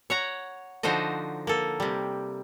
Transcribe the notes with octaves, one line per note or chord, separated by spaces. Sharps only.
C#5 F#5 A#5
D3 F3 D#4 F#4 C5 D#5
A#3 A4
C3 G3